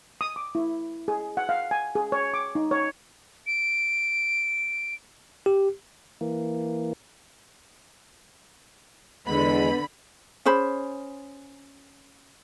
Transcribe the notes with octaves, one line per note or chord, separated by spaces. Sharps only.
D#6
D6
E4
G#4
F#5
F5
G#5
G#4
C#5
D6
D#4
C#5
D7
G4
E3 A#3
E2 D3 G#3 B3 B5
C#4 G#4 C5 B5